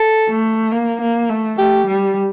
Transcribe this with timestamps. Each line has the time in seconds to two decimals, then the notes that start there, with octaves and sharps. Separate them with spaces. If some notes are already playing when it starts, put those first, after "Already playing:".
Already playing: A4
0.28 A3
0.71 A#3
1.01 A#3
1.29 A3
1.58 A3 G4
1.87 G3